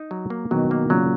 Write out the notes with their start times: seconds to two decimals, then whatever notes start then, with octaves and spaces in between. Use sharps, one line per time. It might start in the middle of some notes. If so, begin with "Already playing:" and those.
Already playing: D#4
0.11 F#3
0.30 A#3
0.51 B2 D#3 F#3
0.71 A#3
0.90 A#2 C#3 F#3